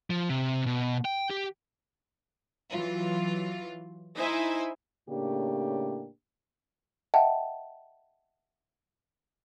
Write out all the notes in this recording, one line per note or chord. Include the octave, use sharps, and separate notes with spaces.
F3
C3
B2
G5
G4
E3 F#3 F4
D#4 E4 C5 E5 G#5
A2 C#3 A#3 D4 G4
D#5 E5 F#5 G5 A5